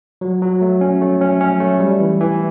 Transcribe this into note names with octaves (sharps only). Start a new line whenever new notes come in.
F#3
F#3
A3
C#4
A3
C#4
C#4
A3
G3
E3
E3